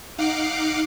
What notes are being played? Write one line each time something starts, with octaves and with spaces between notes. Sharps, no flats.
D#4 F5 F#5 D6 C7 D7